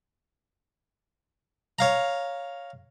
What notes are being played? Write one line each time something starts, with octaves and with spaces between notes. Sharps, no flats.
C#5 F5 A#5